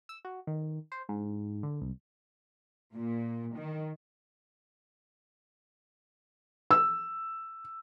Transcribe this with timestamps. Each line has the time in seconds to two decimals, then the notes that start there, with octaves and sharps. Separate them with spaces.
0.09 E6
0.25 F#4
0.47 D#3
0.92 C5
1.09 G#2
1.63 D3
1.81 C2
2.95 A#2
3.56 D#3
6.71 E6